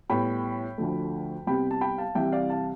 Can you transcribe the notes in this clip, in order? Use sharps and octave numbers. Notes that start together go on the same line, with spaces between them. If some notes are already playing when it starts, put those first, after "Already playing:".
A2 G3 B3 G5 B5
D2 D3 F3 A3
C2 C3 G3 B3 G5 B5
A5
G5 B5
F5 A5
C2 C3 E3 G3 E5 G5
D5 F5
F5 A5